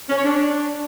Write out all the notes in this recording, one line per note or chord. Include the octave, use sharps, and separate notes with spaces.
C#4
C#5
D4